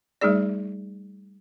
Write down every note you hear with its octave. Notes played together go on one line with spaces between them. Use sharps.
G3 A3 D#4 G#4 D5